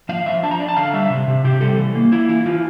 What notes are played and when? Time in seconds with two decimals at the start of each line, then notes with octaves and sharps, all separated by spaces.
0.09 F3 F5
0.26 F3 E5
0.43 D4 A5
0.51 A#5
0.60 D4
0.69 A5
0.76 D3 F5
0.93 G3 E5
1.10 C3
1.28 C3
1.44 C3 G4
1.61 G3 A4
1.78 E3
1.95 A#3
2.12 A#3 E4
2.29 E3 E4
2.46 E3 F4